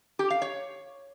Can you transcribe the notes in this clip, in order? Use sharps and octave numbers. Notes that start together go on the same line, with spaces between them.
G4
F5
C#5